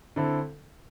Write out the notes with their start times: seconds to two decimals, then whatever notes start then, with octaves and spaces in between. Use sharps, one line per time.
0.16 D3 C4 E4 A4